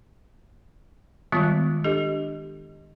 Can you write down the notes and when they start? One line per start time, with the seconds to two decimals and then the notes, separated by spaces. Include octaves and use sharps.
1.32 D#3 G3 G#3 B3 F4
1.84 D4 G4 A4 D#5